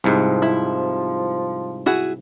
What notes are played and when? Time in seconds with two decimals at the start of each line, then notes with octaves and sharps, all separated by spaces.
0.04 C2 G#2 F3
0.42 E4
1.86 E4 F#4 G#4